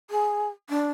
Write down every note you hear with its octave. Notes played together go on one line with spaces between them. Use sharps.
G#4
D4